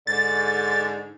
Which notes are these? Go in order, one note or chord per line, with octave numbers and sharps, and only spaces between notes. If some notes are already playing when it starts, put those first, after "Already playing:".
G#2 D3 A6